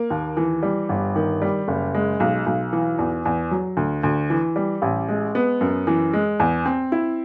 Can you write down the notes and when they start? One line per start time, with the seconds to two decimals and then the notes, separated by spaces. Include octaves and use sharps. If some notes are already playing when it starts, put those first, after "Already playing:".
Already playing: A#3
0.10 D#2
0.37 E3
0.63 G3
0.89 G1
1.16 D#3
1.42 G3
1.68 F#1
1.94 G#3
2.20 B1
2.46 B1
2.73 E3
2.99 E2
3.25 E2
3.51 F#3
3.77 D2
4.03 D2
4.30 E3
4.56 G3
4.82 A1
5.08 G#3
5.35 B3
5.61 F#2
5.87 E3
6.13 G#3
6.40 E2
6.65 C4
6.92 E4